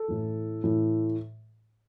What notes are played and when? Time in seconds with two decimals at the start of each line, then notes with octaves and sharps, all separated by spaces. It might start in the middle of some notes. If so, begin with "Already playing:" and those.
Already playing: A4
0.08 A2 E3
0.64 A2 E3